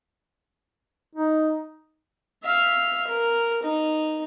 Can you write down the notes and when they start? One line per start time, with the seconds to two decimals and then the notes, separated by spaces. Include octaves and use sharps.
1.15 D#4
2.44 E5 F5
3.07 A#4
3.63 D#4